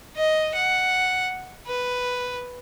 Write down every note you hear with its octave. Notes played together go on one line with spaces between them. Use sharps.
D#5
F#5
B4